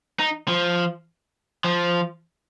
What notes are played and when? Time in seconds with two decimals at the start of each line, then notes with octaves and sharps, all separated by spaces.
0.19 D#4
0.48 F3
1.64 F3